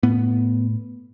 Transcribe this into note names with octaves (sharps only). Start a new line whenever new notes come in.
A2 B3